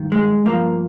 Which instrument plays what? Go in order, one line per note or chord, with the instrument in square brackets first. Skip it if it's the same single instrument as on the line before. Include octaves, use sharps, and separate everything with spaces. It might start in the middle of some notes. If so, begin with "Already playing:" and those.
Already playing: [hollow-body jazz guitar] G2 D#3
G#3
G2 F3 A#3